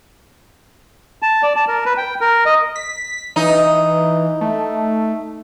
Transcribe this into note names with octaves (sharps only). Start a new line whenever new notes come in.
A5
D5
A5
A#4
B4
G5
A#4
D#5
B6
E3 D#4
A3